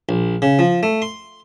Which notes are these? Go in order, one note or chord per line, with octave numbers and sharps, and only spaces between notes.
A#1
C#3
F3
A3
C6